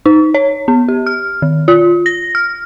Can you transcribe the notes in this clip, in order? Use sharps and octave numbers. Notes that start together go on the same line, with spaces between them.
D#4
C#5
B3
G4
F6
D#3
F4
A#6
F6